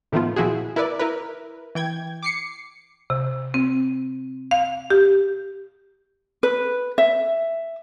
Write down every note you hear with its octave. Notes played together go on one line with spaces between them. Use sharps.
A2 D#3 F3 A3 B3 F4
A#2 F3 E4 F#4 G#4
E4 A#4 B4 D5
E4 A#4 B4
E3 G5 G#6
D6 C7 C#7
C3
C4
F5
G4
B4
E5